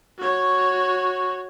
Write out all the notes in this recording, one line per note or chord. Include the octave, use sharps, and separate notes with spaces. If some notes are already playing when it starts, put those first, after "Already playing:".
F#4 C#5